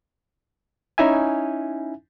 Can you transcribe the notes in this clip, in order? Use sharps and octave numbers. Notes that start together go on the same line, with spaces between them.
C#4 D#4 E4 E5 G#5